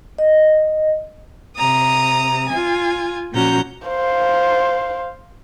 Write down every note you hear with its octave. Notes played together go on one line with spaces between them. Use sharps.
D#5
C3 A#5 D#6
F4 G#5
A#2 F3 C#4 F#4 A#5 G6
C5 F5